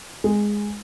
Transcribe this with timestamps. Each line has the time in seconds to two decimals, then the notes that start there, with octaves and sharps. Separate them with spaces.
0.24 G#3